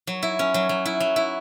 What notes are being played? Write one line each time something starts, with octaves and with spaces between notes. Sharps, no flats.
F#3
E4
C#4
F#3
F#3
E4
F#3
E4